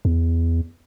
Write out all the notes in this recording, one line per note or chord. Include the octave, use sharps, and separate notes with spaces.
E2